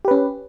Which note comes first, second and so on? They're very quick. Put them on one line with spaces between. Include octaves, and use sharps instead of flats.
G4 B4 C#4